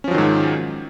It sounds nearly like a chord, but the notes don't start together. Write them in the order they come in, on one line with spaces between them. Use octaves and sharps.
C#4 F3 F#3 D#3 G#2